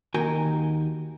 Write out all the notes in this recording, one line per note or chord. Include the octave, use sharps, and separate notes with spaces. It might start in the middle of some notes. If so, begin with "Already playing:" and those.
D#2 D#3 F#4 A#4 G5 G#5